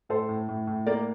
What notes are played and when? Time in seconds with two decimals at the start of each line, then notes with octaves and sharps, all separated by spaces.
0.09 A2 A4 C5
0.29 A2
0.48 A2
0.67 A2
0.87 A#3 A#4 D5